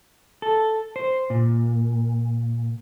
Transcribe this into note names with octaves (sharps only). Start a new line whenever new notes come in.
A4
C5
A#2